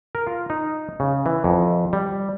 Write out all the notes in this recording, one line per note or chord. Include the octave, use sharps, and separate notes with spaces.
A#4
F4
D#4
C#3
E3
F2
G3